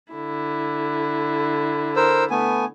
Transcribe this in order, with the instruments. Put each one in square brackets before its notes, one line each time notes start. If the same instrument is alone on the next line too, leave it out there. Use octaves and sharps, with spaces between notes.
[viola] D3 E4
[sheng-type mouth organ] A#4 C5 E6
A3 B3 G#5